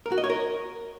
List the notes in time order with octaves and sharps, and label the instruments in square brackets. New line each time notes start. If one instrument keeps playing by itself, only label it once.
[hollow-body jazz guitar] A#4
F#4
D#5
C#5
A#4